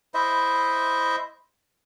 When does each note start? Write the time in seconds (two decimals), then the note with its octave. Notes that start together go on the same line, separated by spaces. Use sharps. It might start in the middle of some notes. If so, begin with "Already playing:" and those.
0.14 E4 C5 D#5 E5